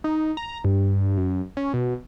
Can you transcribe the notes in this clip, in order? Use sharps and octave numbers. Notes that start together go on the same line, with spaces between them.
D#4
A#5
G2
F#2
C#4
B2